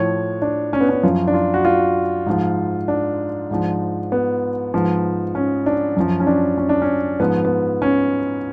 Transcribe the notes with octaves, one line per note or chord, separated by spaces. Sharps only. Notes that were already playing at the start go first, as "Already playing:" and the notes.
Already playing: A2 F3 C#5
D4
C#4
B3
C#4
F#2 F3 F4
D4
F4
F#4
F4
G#2 F3
D4
G#2 F3
B3
G#2 F3
C#4
D4
F#2 F3
C#4
D4
C#4
D4
C#4
G#2 F3 B3
B3
C#4